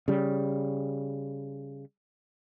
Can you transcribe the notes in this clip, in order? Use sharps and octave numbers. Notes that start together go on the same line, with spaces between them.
C#3 G3